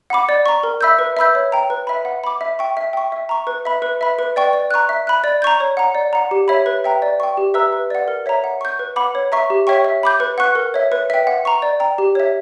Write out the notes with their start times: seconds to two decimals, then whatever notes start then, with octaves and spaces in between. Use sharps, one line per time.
0.10 F#5 B5 D6
0.29 D5
0.46 A#5 C#6
0.63 A#4
0.81 E5 B5 E6 G6
0.99 B4
1.17 E5 B5 E6 G6
1.35 C#5
1.52 G5 A#5
1.70 B4
1.87 E5 B5
2.05 F#5
2.24 B5 D6
2.41 E5
2.59 G5 C#6
2.77 E5
2.93 G5 C#6
3.12 E5
3.29 A#5 C#6
3.47 B4
3.65 E5 B5
3.82 B4
4.01 E5 B5
4.19 B4
4.36 D5 G5 C#6
4.53 D5
4.71 A#5 C#6 F#6
4.89 E5
5.07 B5 F#6
5.24 D5
5.42 A#5 C#6 G6
5.60 C#5
5.77 F#5 A#5
5.95 D5
6.13 F#5 A#5
6.31 G4
6.48 C#5 E5 B5
6.66 B4
6.84 E5 G5 A#5
7.02 D5
7.20 G5 C#6
7.37 G4
7.54 B4 E5 A#5 E6
7.73 B4
7.90 D5 F#5
8.08 A#4
8.26 C#5 E5 A#5
8.44 F#5
8.61 C#6 G6
8.79 B4
8.96 F#5 B5 D6
9.15 C#5
9.32 E5 A#5 C#6
9.50 G4
9.67 C#5 E5 G5 C#6
9.85 E5
10.03 B5 D6 G6
10.20 B4
10.38 F#5 C#6 F#6
10.55 A#4
10.74 C#5 E5
10.92 B4
11.10 E5 G5
11.27 F#5
11.45 A#5 C#6
11.62 D5
11.80 G5 A#5
11.98 G4
12.15 C#5 E5